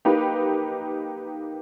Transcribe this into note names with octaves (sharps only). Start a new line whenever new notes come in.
A#3 D#4 G4 B4